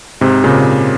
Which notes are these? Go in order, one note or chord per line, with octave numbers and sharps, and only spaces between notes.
G#2 C3
A#2 C#3